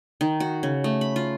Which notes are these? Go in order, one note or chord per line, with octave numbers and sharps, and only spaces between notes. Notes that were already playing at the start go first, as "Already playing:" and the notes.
D#3
F#4
C#3
A3
B5
F4